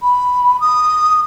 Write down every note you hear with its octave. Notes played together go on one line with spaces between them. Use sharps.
B5
D#6